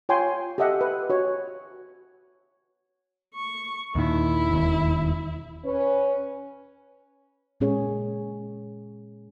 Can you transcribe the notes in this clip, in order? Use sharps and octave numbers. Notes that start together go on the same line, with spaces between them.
F4 C#5 G5 G#5 C6
G4 A4 D#5 E5 F#5
B4
F#4 C#5
C#6
D#2 A#2 D#3 E4
E1 D#2
C#4 B4
A#2 G#3 C#4 G#4 C#5